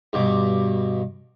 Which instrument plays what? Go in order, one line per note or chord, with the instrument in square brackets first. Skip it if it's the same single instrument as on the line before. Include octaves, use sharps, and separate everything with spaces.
[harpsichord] G2 B2 D6